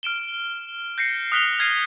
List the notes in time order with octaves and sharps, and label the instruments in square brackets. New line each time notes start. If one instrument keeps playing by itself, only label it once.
[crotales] F6 D7 E7 G7
G6 A#6 C7 C#7
D#6 F6 F#6 B6 F7 G7
F6 G#6 A#6 C7 D#7 F7